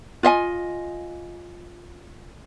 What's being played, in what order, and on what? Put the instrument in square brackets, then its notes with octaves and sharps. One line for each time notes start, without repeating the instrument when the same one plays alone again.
[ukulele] F4 D#5 E5 G#5